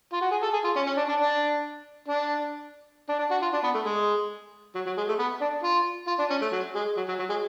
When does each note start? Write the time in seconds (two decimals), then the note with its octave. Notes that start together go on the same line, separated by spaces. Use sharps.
0.13 F4
0.21 F#4
0.31 G#4
0.43 A4
0.53 G#4
0.64 F4
0.76 C#4
0.87 C#4
0.97 D4
1.09 D4
1.20 D4
2.08 D4
3.09 D4
3.19 D4
3.31 F#4
3.42 F4
3.53 D4
3.64 B3
3.75 A3
3.85 G#3
4.75 F#3
4.86 F#3
4.97 G#3
5.09 A3
5.19 B3
5.41 D4
5.63 F4
6.07 F4
6.19 D4
6.30 C#4
6.42 A3
6.52 F#3
6.75 G#3
6.97 F#3
7.08 F#3
7.19 F#3
7.29 G#3